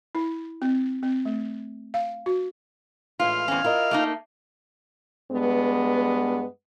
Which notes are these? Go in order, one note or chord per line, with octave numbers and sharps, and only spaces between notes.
E4
C4
C4
A3
F5
F#4
A2 E3 G#3 F4 F5
E2 C4 C#4
E4 F4 A#4 D#5
A3 A#3 D#4
G2 G#3 B3